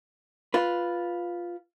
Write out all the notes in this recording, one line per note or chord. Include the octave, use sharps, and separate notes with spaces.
F4 B4